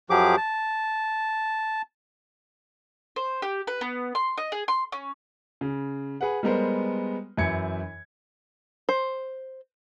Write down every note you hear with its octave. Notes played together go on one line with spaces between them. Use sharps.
F#2 F3 F#3 G4 G#4 D6
A5
C5
G4
B4
B3
C6
D#5
G#4
C6
C#4
C#3
G#4 B4 F#5
G3 G#3 B3 A#4 C5
F#2 E3 E4 G#6 C#7
C5